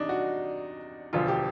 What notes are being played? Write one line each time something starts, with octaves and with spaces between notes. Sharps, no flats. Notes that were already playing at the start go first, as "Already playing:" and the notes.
Already playing: E2 C3 D4 D#4
F#4
E1 D2 D3 F3 F4
G4